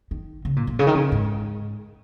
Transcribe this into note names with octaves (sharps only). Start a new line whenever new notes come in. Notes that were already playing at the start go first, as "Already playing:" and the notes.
D#3
C#3
A#2
A#2
C#3
D#3
C#3
G#2